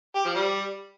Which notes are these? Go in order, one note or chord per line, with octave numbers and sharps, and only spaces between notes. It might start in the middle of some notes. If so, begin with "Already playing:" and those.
G4
F3
G3